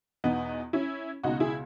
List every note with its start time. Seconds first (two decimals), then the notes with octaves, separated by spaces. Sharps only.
0.24 E2 B2 B3 D#4
0.73 C#4 E4
1.23 C#2 B2 D#4 F#4
1.40 E4 G#4